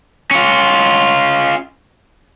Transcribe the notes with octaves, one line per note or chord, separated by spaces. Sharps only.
C#4 F4